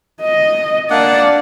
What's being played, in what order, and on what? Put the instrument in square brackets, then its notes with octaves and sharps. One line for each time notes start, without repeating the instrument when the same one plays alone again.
[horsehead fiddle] D#5
[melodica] A#3 D4 F#5 [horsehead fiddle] D5